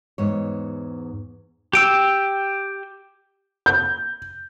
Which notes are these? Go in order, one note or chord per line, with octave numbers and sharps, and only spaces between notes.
E2 G#2 C#5
G4 G5 E6
G6